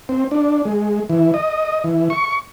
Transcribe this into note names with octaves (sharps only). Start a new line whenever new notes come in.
C4
D4
G#3
E3
D#5
E3
C#6